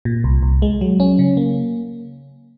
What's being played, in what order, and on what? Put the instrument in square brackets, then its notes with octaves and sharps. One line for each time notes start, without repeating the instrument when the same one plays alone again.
[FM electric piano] A#2
C2
C2
G#3
F#3
C#4
C#3
A#3